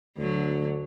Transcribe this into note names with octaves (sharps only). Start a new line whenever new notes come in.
D2 D3 F#3